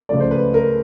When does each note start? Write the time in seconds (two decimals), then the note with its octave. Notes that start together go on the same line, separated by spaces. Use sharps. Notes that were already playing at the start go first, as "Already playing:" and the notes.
0.09 C#2 C#3 F3 A3 D5
0.20 C5
0.31 B4
0.54 A#4